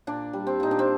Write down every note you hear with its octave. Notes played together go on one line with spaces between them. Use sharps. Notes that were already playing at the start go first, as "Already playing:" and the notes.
A#2 D4
G3
C4
A#2 D#4
D4
C4